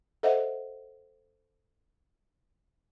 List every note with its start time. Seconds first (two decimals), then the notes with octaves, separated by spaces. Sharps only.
0.23 A4 C5 D#5 E5 F#5